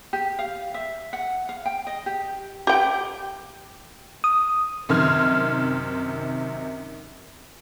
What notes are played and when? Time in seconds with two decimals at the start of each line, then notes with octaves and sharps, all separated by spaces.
0.13 G4
0.39 F5
0.74 E5
1.13 F#5
1.49 F5
1.66 G5
1.87 D#5
2.06 G4
2.67 G4 G5
4.24 D#6
4.89 F#2 C3 D#3 C6 F6 G#6